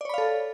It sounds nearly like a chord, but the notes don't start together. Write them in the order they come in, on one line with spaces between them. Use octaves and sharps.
D5 C#5 B5 F5 A4